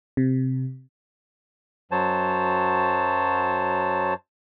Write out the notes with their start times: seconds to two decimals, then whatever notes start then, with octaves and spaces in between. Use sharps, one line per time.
0.17 C3
1.91 F#2 F#3 C5 C#5 A5